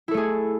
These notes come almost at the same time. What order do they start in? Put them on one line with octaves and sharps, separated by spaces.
E4 A4 A3 G#4